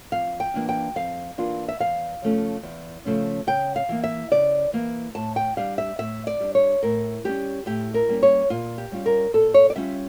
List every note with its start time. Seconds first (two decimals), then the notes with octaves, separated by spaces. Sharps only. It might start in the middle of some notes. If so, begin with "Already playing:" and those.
0.12 F2 F5
0.40 G5
0.54 E3 A#3 D4 F4
0.69 G5
0.96 F2 F5
1.38 E3 A#3 D4 F4
1.68 E5
1.80 E2 F5
2.22 C#3 F3 A3 C#4
2.63 E2
3.05 C#3 F3 A3 C#4
3.47 C#3 G5
3.76 F5
3.89 E3 A#3
4.04 E5
4.31 C#3 D5
4.73 E3 A#3
5.15 A2 A5
5.36 G5
5.57 G3 D4 F5
5.78 E5
5.99 A2 E5
6.27 D5
6.40 G3 D4
6.55 C#5
6.83 A2 A#4
7.24 G3 A#3 G4
7.29 C#4
7.66 A2 G4
7.94 A#4
8.08 G3 A#3 C#4
8.23 C#5
8.50 A#2 F4
8.78 G4
8.92 G3 C#4 F4
9.06 A#4
9.34 A#2 A4
9.54 C#5
9.70 D5
9.76 G3 C#4 F4 E5